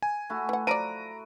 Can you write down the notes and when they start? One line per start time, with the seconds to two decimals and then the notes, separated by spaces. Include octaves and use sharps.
0.02 G#5
0.30 A3 E4 F#4
0.49 E3 F#5
0.67 F3 F#3 D5 A#5 D7 D#7